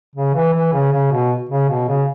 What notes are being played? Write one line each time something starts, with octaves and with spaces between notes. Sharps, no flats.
C#3
E3
E3
C#3
C#3
B2
C#3
B2
C#3